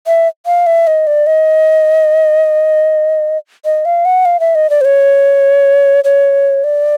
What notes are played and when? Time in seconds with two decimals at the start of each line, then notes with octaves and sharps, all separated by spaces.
0.07 E5
0.46 F5
0.67 E5
0.87 D#5
1.07 D5
1.27 D#5
3.65 D#5
3.85 F5
4.05 F#5
4.25 F5
4.40 E5
4.55 D#5
4.70 D5
4.81 C5
4.85 C#5
6.04 C#5
6.64 D5